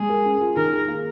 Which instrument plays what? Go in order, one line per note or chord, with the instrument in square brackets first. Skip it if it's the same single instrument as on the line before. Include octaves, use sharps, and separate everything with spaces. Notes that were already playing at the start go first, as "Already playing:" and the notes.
Already playing: [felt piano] G#3 [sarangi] G#4
[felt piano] A#4
C#4
F4
[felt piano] D#3 [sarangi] A#4
[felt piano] G#4
A#3